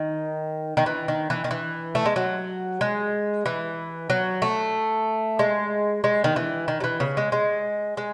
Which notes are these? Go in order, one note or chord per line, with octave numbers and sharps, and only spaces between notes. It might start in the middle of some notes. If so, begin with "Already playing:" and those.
Already playing: D#3
D#3
E3
D#3
E3
D#3
E3
A3
G#3
F#3
G#3
E3
F#3
A3
G#3
G#3
D#3
E3
D#3
F#3
E3
C#3
G#3
G#3
G#3